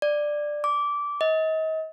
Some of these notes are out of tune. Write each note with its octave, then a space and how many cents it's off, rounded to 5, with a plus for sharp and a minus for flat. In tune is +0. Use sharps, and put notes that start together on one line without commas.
D5 +10
D6 -15
D#5 +35